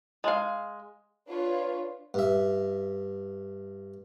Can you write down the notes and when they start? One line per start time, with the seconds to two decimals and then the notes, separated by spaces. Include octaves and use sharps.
0.24 G#3 F5
1.28 D4 F4 B4 C#5
2.14 G2 E5